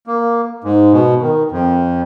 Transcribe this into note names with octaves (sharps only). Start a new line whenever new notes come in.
A#3
G#2
B2
D#3
F2